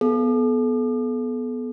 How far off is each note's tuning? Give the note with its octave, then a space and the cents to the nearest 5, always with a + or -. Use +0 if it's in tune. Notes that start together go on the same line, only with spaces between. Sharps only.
B3 +0 A4 -40